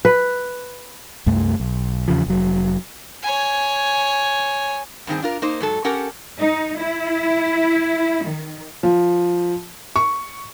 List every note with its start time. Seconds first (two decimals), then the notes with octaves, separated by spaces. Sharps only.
0.05 B4
1.26 C2 F#2 A3
1.60 B1
2.08 E2 C#3 F3
2.26 F1 F#3
3.23 C#5 G#5
5.07 G2 D#3 C4 G#4
5.22 D4 F4 A#4
5.42 A#3 D#4 C5
5.60 G#2 F#3 A4
5.85 C#4 G4 A4 A#4 F#5
6.39 D#4
6.79 E4
8.27 D#3
8.83 F3
9.96 C#6